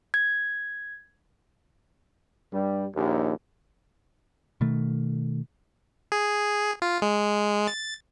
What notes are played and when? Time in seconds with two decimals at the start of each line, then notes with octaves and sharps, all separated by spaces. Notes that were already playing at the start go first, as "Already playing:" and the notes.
0.14 G#6
2.52 G2 G3
2.95 A#1 D#2
4.61 B2 D#3 A3
6.12 G#4
6.82 F4
7.02 G#3
7.68 A6